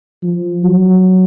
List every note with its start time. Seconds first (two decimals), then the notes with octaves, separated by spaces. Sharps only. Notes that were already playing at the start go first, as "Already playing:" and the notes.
0.23 F3
0.63 F#3